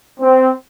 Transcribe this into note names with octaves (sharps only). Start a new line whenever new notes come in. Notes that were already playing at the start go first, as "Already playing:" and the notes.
C4